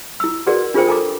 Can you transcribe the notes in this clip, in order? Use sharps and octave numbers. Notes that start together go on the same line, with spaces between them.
E4 E6
F#4 G#4 A#4 B4 D5 F#5
D4 F4 G#4 A#4 C5 G5
A4 G#5 A#5 D6